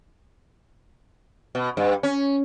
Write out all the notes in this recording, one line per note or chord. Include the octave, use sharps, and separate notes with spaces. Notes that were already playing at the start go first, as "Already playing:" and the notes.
B2
G2
C#4